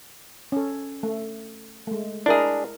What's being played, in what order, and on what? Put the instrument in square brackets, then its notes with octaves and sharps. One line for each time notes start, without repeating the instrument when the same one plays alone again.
[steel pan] C#4 A4
A3
G#3 A3
[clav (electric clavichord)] D4 G#4 [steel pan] E4 A#4 D#5